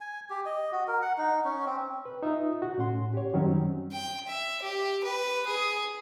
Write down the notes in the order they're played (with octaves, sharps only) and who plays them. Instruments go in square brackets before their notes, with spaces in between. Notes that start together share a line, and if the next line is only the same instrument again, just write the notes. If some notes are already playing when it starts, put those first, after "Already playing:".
[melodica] G#5
G4
D#5
F#4
A#4
F#5
D#4
C#4
C4
[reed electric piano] B4
D#4 F4 E5
F#4
A2 C#4 F#5 C6
G4 C#5
F#2 D#3 F#3 G3 C4 C#4
[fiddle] G5
E5
G4
B4
G#4